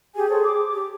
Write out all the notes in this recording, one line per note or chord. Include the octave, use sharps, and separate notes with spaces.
G4 G#4 G#5
A4 C5 C#5
D6
G4